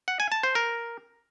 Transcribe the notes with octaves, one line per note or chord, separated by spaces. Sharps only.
F#5
G#5
A5
C5
A#4